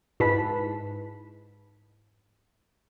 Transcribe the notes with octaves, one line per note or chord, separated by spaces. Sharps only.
G#2 E4 B4 A5 B5 B6